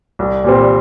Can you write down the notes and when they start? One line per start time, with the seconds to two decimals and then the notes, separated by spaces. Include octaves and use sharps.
0.19 C2
0.44 A#2 G3 C4